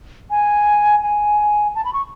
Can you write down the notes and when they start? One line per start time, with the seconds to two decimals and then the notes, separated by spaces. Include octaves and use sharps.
0.30 G#5
1.03 G#5
1.75 A5
1.85 B5
1.93 C#6